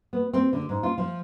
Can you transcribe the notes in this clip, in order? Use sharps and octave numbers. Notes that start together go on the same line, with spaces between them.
B3
C4
D3
G#2
F4
F3